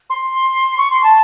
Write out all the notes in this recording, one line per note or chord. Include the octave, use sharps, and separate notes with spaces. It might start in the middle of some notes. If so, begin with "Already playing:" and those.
C6
C#6
C6
A5